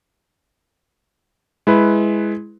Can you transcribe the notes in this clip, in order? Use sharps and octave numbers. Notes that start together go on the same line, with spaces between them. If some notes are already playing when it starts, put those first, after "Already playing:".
G#3 E4 B4